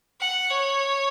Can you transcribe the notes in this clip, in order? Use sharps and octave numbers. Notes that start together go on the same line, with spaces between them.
F#5
C#5